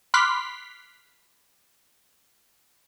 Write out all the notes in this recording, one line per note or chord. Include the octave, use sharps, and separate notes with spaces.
B5 C6 D6 F6 F#6 B6